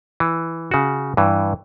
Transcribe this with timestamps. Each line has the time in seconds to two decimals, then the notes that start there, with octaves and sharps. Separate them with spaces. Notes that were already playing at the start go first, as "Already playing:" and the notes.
0.20 E3
0.71 C#3 F#4
1.17 G2 E3